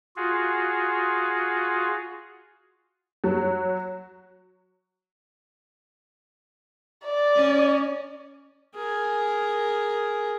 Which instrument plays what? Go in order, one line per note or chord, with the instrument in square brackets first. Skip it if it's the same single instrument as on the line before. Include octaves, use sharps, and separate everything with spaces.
[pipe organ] F4 F#4 G#4
[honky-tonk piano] F#3
[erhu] D5
[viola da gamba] C#4
[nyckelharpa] G#4 A#4